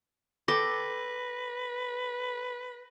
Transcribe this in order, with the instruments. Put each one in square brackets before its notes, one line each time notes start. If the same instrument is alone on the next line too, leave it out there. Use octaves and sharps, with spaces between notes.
[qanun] A4 G5 [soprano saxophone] B4 [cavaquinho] D6 [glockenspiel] A#6